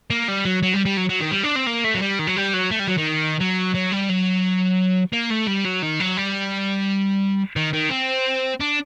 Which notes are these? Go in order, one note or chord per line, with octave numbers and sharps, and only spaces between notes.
A#3
G3
F#3
F#3
G3
G3
F#3
F#3
D#3
G3
D4
C4
A#3
A3
F#3
G3
D#3
F#3
G3
F#3
A3
G3
F#3
D#3
F#3
F#3
G3
F#3
A#3
A3
G3
F#3
D#3
F#3
G3
D#3
D#3
C4
D4